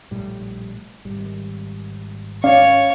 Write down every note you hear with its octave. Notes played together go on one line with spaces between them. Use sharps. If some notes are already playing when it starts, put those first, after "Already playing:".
A#1 A2 G3
G#1 G3
C#4 C#5 D5 F5